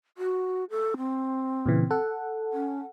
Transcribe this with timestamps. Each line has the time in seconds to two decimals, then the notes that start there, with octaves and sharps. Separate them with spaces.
0.18 F#4
0.70 A4
0.97 C4
1.66 A#2 C#3 E3
1.91 A4 F#5
2.53 C#4